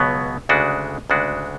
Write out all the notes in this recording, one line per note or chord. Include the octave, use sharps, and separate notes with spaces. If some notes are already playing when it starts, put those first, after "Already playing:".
Already playing: C#2 B2 F#3 B3
D2 C#3 G#3 D4 F#4
D2 C#3 G#3 D4 F#4